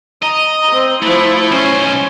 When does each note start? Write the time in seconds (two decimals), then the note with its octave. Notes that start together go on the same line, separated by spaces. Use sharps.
0.23 D#5 A#5
0.71 C4
1.02 F3 A3 E4
1.51 B1 C#4 C5